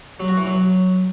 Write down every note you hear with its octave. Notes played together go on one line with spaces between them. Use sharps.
F#3
F#4
E3
F#3